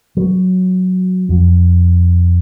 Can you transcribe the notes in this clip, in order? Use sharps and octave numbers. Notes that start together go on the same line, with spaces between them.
F#3
F2